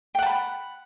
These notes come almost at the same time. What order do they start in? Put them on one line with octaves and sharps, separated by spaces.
G5 F#5 A5 B5